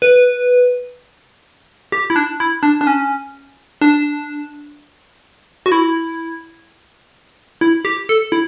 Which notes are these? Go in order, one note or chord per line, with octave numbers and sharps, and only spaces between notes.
B4
G4
E4
D4
E4
D4
D4
C#4
D4
F#4
E4
E4
G4
A4
E4